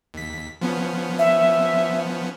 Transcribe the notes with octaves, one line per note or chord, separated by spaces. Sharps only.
D#2 B6
F3 B3 C#4
E5